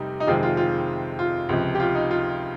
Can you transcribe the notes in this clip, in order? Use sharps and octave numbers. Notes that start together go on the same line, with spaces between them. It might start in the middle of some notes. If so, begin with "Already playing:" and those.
Already playing: F1 C3 G3 D#4
D#4
F2 C3 D#3 G#3 C4 F4
F4
F4
F4
C#2 C3 F3
G4
F4
D#4
F4